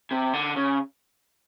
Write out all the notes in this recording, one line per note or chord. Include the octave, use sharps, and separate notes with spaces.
C3
D3
C#3